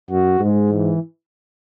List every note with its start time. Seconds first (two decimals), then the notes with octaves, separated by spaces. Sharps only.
0.10 F#2 F#4
0.39 G#2 G#3
0.68 E3